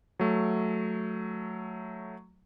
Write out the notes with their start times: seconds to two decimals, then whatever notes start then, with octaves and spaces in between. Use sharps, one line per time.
0.19 F#3 A3